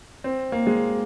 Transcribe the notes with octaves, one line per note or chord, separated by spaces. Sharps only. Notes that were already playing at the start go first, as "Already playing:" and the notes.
C4
A#3
G#3